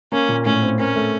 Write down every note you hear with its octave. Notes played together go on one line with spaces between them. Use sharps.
A#3 C#4
A#2
A2 C#4
C4
C#4 A#4
A3